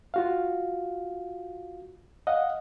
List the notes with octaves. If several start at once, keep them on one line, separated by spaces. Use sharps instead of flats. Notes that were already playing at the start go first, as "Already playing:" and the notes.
F4 F#4 F5
D#5 F5 F#5